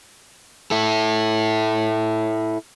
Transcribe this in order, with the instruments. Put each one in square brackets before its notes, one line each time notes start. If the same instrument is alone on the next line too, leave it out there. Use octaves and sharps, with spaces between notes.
[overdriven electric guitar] E4 A4